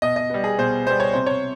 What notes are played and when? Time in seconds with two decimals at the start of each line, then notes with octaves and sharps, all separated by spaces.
0.02 B2 D#5
0.16 D#5
0.30 G3 B3
0.44 G#4
0.58 B2 C5
0.86 G3 B3 C5
1.00 C#5
1.13 C3 C5
1.26 C#5